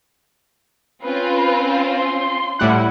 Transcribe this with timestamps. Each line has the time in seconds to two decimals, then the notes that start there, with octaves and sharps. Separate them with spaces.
1.03 C4 C#4 F4 B4
1.95 C6
2.59 A2 G3 E4 F#5